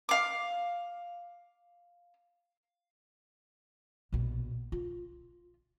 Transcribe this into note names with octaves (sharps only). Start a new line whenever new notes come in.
F5 D6
A#1 B2
F4